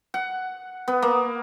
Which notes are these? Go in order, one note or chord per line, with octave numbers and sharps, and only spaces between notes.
F#5
B3
A#3